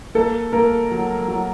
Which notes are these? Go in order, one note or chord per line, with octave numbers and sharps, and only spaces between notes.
A#3 A4
A#3 A#4
F#3
F#3